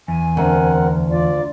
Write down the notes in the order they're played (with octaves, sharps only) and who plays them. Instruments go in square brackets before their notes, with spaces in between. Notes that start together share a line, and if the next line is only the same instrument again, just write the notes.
[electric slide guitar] E2 [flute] G#5
[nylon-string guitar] D2 [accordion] C4 A#4 F#5
[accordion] F4 [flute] D5